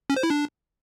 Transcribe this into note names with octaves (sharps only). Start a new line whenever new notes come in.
C#4
C5
E4
D4